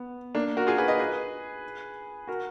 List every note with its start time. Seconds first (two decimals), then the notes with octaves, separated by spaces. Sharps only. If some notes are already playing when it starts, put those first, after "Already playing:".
Already playing: B3
0.35 A#3 D4
0.57 F#4 A#4
0.67 F4 G#4
0.78 G#4 B4
0.88 B4 D#5
0.99 G#4 B4
2.27 F#4 A#4